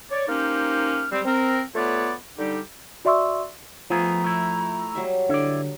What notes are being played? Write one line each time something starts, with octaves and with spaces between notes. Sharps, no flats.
C#5 D5
A#3 C#4 D#4 G4 C5 F6
G3 C4
C4 A#4
A3 B3 F4 B4 C#5 D5
D3 G3 D#4 G4
F#4 D5 E5 C6 C#6 E6
F3 A3 B3 G#4 A#5
A3 E4
F#3 G3 E5
D3 E4 D5